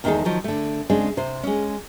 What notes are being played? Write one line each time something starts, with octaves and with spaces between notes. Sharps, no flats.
E2 D#3 G#3 D#4 G#4 A4
D#3 F3 F#3
D3 A3
C#3 G#3 C4 D4
C3 C5
G#3 C#4